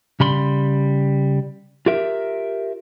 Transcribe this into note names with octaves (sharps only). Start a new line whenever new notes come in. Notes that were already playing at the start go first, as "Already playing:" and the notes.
C#3 G3 B5 C6
F4 G4 A#4 E5